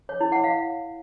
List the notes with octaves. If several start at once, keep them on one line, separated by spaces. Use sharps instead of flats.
C#5
E4
F#5
F5